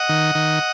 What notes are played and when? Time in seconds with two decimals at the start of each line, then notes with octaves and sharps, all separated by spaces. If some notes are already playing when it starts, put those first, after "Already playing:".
Already playing: D#5 F#5
0.09 D#3
0.35 D#3